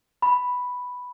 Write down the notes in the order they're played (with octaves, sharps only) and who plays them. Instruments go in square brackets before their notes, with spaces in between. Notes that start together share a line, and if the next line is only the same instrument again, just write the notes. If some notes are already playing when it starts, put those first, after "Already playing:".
[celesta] B5